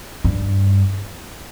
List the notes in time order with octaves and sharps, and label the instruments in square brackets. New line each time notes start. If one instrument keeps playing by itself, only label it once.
[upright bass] G2